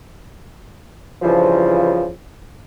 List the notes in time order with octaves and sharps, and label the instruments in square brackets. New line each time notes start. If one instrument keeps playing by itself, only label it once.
[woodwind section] G2 C#3 E3 F3